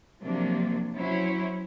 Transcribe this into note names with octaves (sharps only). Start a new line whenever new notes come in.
C3 F3 F#3 A#3 D4
F#3 C#4 E4 C5 C#5